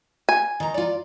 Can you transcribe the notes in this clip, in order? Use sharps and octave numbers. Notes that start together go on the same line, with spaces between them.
G#5
D#3 A#5
F4 D5